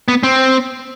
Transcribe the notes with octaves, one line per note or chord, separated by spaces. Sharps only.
B3
C4